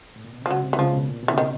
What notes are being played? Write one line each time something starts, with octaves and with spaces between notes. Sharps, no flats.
A2
A#2
B2
C3
F3
C#2 C#3 F#3
C2 C3
E3
C#2 C#3 F3
B2
A#2
B2
C#3 E3
C3 D#3